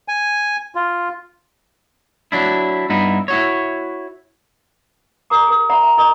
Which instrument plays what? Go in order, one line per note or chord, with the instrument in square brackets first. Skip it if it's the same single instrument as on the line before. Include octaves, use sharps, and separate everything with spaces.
[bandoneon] G#5
F4
[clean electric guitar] F#3 D4 E4
G2 B3 D#4 E4
E4 F#4 C#5
[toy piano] G4 A#4 A#5 D6
G#4 A#4
D5 E5 F#5 A#5 B5
E5 A#5
E4 G#4 A#4 D#5 A#5 D6